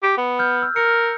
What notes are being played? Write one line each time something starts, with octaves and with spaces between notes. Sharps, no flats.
G4
B3
F6 G6
E6
A#4 F6 C#7